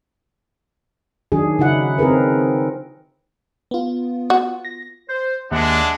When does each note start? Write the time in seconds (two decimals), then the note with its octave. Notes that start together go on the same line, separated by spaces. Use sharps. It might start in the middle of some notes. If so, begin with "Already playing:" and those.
1.32 D#3 F#3 D4 G#4
1.59 C#3 D#4 E4 F#5
1.98 C4 F4 G#4 A#4 B4
3.71 B3 F4
4.30 F#4
4.65 A#6
5.09 C5
5.52 D#2 G#3 D4 E5 F#5